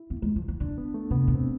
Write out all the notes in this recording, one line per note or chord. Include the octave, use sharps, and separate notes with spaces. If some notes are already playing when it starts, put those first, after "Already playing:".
Already playing: E4
B3
G#3
F3
F3
D3 D4
B3
A3
C3 B3
B2
C4